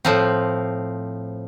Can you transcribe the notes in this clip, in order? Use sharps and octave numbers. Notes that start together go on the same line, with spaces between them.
A2 F3 C4